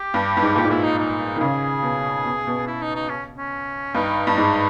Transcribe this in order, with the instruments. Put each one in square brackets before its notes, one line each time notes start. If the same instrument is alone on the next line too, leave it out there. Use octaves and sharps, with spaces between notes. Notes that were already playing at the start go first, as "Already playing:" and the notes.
Already playing: [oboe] G4
[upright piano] G2
G2
G#2
[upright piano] A#2 [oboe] G4
[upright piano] G#2
[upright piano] A#2 [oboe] E4
[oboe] D#4
D#4
[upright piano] D#3
[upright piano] C#3 [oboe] G#4
[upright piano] B2
B2
B2
[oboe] E4
D#4
D#4
C#4
C#4
[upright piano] G2 [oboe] D#4
[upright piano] G2
G#2